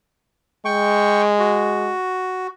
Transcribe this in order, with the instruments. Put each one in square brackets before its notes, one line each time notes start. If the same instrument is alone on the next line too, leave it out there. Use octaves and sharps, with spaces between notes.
[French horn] G#3 [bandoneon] G5 C#6
[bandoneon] F#4